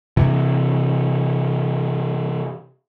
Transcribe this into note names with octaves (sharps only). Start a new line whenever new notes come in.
C3 E3